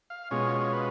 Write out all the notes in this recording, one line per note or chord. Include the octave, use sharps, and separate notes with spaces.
F5
B2 G#3 C#4 F4 C#5
C#5
B4